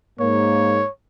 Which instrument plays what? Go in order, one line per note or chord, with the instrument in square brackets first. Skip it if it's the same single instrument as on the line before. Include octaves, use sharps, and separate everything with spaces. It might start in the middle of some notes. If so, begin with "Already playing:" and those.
[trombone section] G#2 A#3 [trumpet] C#5